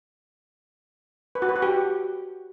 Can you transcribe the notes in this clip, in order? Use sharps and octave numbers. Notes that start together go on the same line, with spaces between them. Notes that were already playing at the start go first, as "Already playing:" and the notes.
B4
F#4
B4
F#4
G4